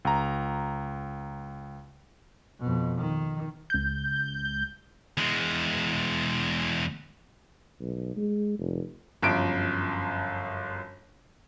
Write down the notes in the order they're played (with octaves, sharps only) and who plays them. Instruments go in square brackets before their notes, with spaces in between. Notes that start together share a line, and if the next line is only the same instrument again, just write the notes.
[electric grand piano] C#2 A#5
[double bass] F2 B2
D#3
[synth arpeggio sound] C#2 G6
[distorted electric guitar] E2 G#3
[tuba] B1
G#3
F1
[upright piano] G1 F#2 F3 D7